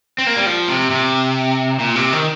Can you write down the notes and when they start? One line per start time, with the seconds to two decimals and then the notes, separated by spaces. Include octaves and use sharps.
0.18 C4
0.27 A#3
0.37 G3
0.46 F3
0.68 C3
0.91 C3
1.79 A#2
1.96 C3
2.13 D#3